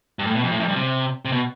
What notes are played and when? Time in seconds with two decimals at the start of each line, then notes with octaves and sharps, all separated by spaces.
0.19 G2
0.27 A2
0.35 B2
0.43 F2
0.51 A2
0.60 F2
0.68 G2
0.76 C3
1.25 C3
1.32 B2